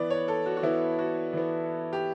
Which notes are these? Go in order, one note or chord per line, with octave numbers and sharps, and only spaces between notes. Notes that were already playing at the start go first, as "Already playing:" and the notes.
Already playing: E3 B3 D5
C#5
A4
F#4
F#4
E3 B3 E4
F#4
E3 B3
G4